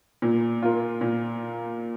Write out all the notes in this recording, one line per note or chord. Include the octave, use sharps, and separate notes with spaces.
A#2
A#3 F4
A#2